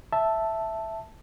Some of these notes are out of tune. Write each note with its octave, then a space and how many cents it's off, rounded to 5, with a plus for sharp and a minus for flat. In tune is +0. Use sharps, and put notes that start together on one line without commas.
E5 +0 A5 +0